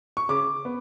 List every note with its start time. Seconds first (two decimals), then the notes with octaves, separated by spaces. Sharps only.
0.17 C#6
0.29 C#3 D6
0.65 B3